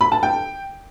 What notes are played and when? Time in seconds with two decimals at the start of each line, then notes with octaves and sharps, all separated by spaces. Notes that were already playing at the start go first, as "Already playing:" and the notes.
0.01 B5
0.12 A5
0.23 G5